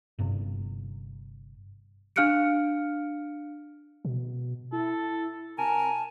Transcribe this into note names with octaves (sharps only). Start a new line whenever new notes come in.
G1 G2 C3
D4 F5 F6 F#6 C#7 D7
B2
E4 A4
C3 A#4 G#5 A5